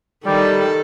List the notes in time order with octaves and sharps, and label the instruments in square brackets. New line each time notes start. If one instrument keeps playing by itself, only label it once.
[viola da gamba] D#3 A4 [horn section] G3